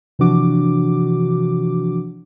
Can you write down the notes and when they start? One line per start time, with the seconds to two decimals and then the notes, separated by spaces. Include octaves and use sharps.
0.19 C3 E3 F3 D4 F#4 D6